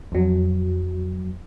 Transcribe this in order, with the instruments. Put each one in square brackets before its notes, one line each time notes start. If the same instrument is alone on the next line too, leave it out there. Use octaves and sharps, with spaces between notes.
[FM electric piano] F2 F#3